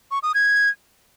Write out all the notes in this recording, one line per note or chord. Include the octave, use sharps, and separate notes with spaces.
C#6
D#6
G#6